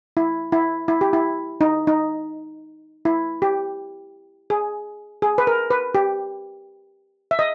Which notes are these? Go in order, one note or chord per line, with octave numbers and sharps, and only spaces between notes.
E4
E4
E4
G4
E4
D#4
D#4
E4
G4
G#4
G#4
B4
A#4
B4
G4
E5
D#5